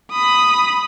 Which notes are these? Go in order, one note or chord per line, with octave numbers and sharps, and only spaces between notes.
B5 D#6